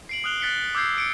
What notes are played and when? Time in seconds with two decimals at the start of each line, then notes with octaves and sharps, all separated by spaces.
0.09 C7 D7 F#7
0.24 D#6 F6 F#6 F7 G7
0.40 F#6 A6 B6 C#7 G7
0.75 D6 E6 G6 G#6 C7
0.98 C#7 D7